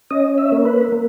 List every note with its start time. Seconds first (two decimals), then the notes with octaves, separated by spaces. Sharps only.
0.10 C#4 D#5
0.38 E5
0.52 A#3
0.65 B4
0.92 A#3